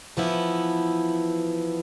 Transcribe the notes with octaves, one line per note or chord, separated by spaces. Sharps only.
E3 F3 B3 E4